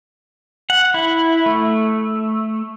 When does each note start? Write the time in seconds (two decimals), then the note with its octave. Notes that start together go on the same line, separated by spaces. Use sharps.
0.70 F#5
0.94 E4
1.46 A3